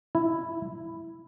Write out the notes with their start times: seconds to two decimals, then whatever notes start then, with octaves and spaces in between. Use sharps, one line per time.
0.15 E4